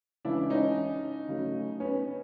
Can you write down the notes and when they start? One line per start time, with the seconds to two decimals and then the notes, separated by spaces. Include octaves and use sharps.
0.25 C#3 E3 G#3 D4 E4
0.50 C#4 D#4
1.28 C#3 F#3 A3
1.80 B3 C#4